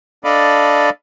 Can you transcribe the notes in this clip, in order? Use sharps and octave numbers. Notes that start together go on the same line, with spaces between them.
D4 A4 D5 D#5 F5 B5